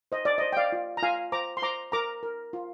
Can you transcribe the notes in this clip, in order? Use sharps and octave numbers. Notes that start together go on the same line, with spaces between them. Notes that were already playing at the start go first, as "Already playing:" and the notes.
C5 D#5
D5
C5 D#5
G5
D5 F5
F4
A#5
F4 F5 G#5
C5 A#5 D6
C6
C5 A#5 D6
A#4 A#5 D6
A#4
F4